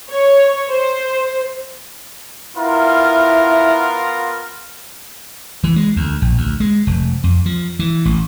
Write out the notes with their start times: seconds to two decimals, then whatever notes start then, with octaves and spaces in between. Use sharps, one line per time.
0.11 C#5
0.70 C5
2.56 B3 E4 F4 A#4
5.64 E3
5.76 G#3
5.96 D2
6.22 A#1
6.38 D2
6.60 G#3
6.87 F1
7.24 F2
7.46 F3
7.79 E3
8.05 A1